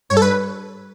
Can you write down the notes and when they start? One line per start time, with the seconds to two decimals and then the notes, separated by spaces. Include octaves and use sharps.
0.10 G2 C#5
0.17 A4
0.22 B4